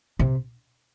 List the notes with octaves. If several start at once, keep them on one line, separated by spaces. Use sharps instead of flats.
C3